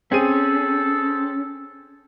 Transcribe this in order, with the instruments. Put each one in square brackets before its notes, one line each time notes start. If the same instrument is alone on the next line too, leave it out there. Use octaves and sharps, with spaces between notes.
[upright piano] C4 G#4 D#7 [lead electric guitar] C#4 [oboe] A4